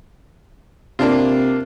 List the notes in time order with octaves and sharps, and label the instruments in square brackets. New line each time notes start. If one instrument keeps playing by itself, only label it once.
[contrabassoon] C3 [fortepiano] A#3 D4 F4